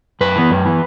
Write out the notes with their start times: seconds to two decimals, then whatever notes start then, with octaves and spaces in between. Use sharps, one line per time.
0.21 F#2 B4
0.36 E3 B3
0.51 F#2
0.65 E3 B3